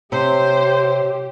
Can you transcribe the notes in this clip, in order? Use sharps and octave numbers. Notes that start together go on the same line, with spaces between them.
C3 G4 C5 C#5